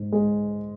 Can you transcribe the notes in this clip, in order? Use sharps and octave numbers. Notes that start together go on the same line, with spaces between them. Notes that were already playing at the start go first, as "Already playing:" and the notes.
Already playing: G#2
G#3